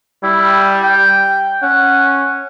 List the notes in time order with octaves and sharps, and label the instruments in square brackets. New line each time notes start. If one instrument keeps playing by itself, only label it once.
[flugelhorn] G3 [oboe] E4
[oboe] G5
[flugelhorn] C#4 [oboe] F#5